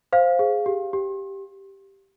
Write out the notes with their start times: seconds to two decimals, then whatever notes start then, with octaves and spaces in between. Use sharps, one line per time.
0.13 C5 F5
0.39 G#4
0.66 G4
0.93 G4